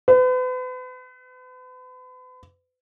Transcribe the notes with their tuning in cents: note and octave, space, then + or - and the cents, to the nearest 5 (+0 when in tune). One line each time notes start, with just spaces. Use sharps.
B4 +40